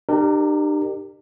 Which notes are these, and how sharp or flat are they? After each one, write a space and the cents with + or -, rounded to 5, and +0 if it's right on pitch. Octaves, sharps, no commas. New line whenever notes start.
D4 +45 G4 +0 A#4 -15